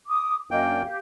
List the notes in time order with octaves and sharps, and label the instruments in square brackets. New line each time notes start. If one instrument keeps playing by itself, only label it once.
[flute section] D6 D#6
[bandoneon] F#2 A#3 G5 [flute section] D#5
[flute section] D4
G4 F5